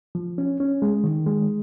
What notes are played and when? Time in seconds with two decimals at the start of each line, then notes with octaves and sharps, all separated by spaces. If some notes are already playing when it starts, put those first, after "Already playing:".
0.15 F3
0.38 C#4
0.60 C#4
0.82 G#3
1.04 D#3
1.27 G#3